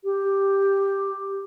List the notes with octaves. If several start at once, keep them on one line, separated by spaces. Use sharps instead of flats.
G4